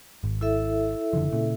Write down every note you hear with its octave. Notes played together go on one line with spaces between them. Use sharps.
G#1
E4 A4 E5
F#1 D3 F3
A#2 C#3